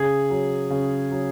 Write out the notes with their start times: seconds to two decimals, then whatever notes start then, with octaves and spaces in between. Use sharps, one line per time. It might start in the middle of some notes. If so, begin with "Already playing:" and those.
Already playing: C#3 G#4
0.30 F#3
0.70 C#3
1.11 F#3